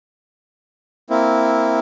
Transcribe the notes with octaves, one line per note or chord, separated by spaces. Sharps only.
A#3 C4 E4